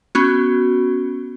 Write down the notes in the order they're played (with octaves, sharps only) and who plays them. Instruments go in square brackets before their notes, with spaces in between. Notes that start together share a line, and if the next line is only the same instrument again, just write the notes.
[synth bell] B3 C#4 F#4